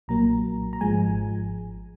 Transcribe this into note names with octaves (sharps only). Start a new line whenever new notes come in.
B1 A#2 F#3 A#3 A#5
A#5
G#1 G#2 F3 G#3 G#5